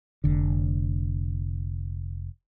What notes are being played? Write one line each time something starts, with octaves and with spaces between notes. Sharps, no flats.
F1 D3